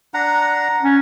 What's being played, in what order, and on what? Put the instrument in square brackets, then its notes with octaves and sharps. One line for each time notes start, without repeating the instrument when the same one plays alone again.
[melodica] D4 F#5 A#5
[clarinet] C#4